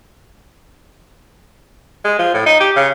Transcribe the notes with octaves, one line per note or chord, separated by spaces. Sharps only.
G#3
F3
A2
D#4
G4
C#3